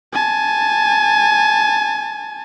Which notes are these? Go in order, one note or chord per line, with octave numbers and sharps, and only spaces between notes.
G#5 A5